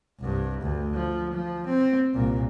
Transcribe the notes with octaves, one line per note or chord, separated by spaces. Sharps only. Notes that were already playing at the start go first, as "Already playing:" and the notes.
C2 G2
D2
F3
F3
C4
C2 A#2